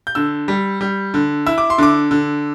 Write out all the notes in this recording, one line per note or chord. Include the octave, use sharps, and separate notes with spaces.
G6
D3 E6
G3
G3
D3
E4 E6
D6
C6
D3 D6
D3